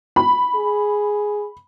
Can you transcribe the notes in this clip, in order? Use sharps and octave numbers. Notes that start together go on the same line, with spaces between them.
B5
G#4